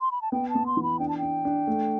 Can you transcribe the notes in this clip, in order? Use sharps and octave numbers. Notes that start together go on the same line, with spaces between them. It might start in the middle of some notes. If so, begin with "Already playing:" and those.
C6
B5
A5
B3 G5
A5
B3
C6
E3
B5
D4 G5
A5
D4 G5
D4
A3